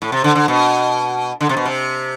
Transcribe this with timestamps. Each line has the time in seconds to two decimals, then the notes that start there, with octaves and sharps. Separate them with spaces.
0.02 A2
0.12 C3
0.24 D3
0.35 D3
0.48 B2
1.41 D3
1.49 C3
1.57 B2
1.66 C3